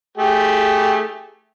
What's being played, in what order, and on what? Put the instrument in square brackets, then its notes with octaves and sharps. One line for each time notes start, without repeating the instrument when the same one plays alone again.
[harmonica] A3 G4 G#4